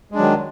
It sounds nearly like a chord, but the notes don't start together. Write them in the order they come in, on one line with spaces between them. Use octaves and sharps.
G#3 D4 F#3 D#3